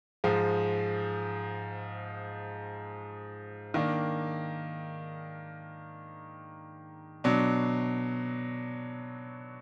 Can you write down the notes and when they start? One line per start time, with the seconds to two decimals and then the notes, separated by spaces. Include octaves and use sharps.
0.24 G#2 F3 G#3
3.74 D#3 A#3 D4
7.24 B2 F#3 D4